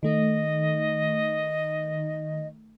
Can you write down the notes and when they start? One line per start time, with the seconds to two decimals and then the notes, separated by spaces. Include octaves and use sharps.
0.03 D#3 A3 D#4 D#5